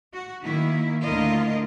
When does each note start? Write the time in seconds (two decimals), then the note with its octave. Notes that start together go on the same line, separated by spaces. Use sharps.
0.13 F#4
0.42 D#3 A#3 E4
1.04 D2 D3 E4 F4 A#4 D#5